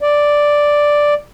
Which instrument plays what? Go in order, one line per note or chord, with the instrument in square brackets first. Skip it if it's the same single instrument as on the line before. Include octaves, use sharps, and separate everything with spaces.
[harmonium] D5